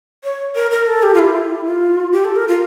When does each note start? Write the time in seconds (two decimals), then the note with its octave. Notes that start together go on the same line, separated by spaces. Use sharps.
0.24 C#5
0.55 A#4
0.71 A#4
0.87 A4
1.03 G4
1.14 F4
1.19 E4
1.65 F4
2.12 G4
2.25 A4
2.36 A#4
2.48 F4